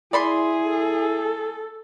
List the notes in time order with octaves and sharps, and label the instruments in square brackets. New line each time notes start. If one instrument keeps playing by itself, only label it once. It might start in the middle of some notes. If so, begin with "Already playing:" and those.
[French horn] E4 [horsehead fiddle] G#4 [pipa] D5 B5 C6
[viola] A4